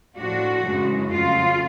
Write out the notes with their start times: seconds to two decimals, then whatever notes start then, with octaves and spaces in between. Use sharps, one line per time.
0.17 A2 F3 A3 D4 F#4
0.64 F#2 C#3 E3 G#3
1.11 F2 C#3 F#3 A3 F4